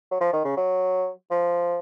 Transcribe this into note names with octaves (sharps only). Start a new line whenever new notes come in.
F#3
F3
D#3
C#3
F#3
F3